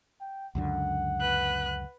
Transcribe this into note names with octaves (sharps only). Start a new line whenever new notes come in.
G5
C#2 F#2 D3 F#5
B4 F#6